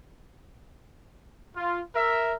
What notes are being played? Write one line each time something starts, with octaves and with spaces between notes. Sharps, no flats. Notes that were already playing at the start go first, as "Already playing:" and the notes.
F4
A#4 E5